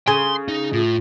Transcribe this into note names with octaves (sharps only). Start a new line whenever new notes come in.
C#3 G#5 C6
D#4
A2 F4